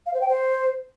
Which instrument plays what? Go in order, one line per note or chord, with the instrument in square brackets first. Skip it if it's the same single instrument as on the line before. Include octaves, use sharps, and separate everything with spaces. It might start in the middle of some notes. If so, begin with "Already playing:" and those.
[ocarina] F5
C5
G5
C5